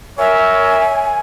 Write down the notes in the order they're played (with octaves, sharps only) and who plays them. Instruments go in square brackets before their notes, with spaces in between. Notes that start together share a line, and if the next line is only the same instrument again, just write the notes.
[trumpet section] A#4 C#5 E5 [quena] G#5